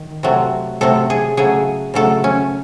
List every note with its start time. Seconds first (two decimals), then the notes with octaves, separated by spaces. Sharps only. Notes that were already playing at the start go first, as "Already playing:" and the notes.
Already playing: D#3
0.23 C3 F#3 A3
0.81 C3 F#3 A3 A4
1.10 G#4
1.37 C#3 F#3 A3 G#4
1.94 C#3 F#3 A3 A4
2.24 C#4